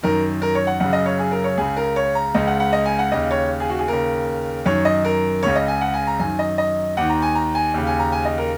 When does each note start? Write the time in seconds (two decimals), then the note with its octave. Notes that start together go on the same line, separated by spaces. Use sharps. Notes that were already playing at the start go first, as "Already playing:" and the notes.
0.03 F#2 D#3 A#4
0.42 A#4
0.55 C#5
0.67 F#5
0.80 F#2 C#3 F#5
0.93 D#5
1.06 C#5
1.19 G#4
1.32 A#4
1.44 C#5
1.57 C#2 C#3 G#4
1.77 A#4
1.96 C#5
2.15 A#5
2.35 C#2 C#3 D#5
2.47 F#5
2.60 F#5
2.73 D#5
2.86 G#5
2.99 F#5
3.12 D#2 C#3 D#5
3.31 C#5
3.60 G#4
3.70 F#4
3.79 G#4
3.88 D#2 C#3 A#4
4.66 F#2 D#3 C#5
4.85 D#5
5.05 A#4
5.43 C#2 C#3 C#5
5.56 D#5
5.68 G#5
5.81 F#5
5.94 G#5
6.07 A#5
6.19 F#2 D#3 G#5
6.39 D#5
6.58 D#5
6.97 D#2 D#3 F#5
7.09 A#5
7.22 G#5
7.35 A#5
7.55 G#5
7.74 D#2 C#3
7.87 G#5
7.99 A#5
8.12 G#5
8.25 D#5
8.38 A#4